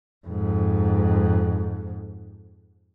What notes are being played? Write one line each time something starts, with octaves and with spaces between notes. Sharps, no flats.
F2 G#2